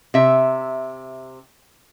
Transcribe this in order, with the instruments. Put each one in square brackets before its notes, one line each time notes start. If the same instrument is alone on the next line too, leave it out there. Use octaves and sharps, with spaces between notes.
[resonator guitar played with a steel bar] C3 E5